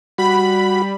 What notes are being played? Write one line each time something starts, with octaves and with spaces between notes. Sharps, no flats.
G3 F#4 B5